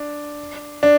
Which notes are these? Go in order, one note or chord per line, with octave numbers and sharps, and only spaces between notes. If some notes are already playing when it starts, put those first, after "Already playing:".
Already playing: D4
D4